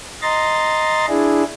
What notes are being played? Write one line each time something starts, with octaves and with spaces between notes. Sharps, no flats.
D#5 A#5 C6 A6
D4 E4 G#4